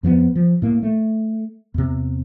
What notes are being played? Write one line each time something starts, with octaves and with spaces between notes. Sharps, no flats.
F2 F3 F#3 B3
F3
A2 A#3
A3
E2 C3